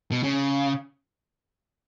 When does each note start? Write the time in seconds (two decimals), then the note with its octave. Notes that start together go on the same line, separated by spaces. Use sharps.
0.12 B2
0.23 C#3